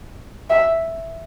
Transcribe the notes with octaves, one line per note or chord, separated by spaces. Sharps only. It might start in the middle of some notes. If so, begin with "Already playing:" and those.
E5